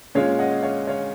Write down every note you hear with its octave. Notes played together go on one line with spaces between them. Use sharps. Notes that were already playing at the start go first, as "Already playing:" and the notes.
A#2 G#3 C#4 C#5 F5
D#5 F#5
C#5 F5
C#5 F5